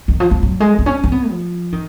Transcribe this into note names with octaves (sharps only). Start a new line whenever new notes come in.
D#3
F3
F3
F#3
G#3
B3
C#4
C#4
B3
F3
D#3